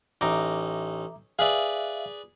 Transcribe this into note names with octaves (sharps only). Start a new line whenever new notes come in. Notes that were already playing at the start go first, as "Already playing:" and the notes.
A1 D#4 E5 A#5 D6
G#4 B4 D5 E5 F5